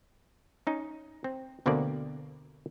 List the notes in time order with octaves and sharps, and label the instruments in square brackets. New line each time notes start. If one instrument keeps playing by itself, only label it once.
[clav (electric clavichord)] C#4 D#4
C4
D2 B2 D3 A#3 C4 D5